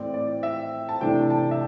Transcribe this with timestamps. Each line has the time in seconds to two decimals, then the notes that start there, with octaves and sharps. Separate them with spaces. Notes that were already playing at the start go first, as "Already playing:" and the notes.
Already playing: A2 E3 C4 D5
0.14 D5
0.43 E5
0.89 A5
1.01 C3 E3 A3 D4 G5
1.30 A5
1.51 E5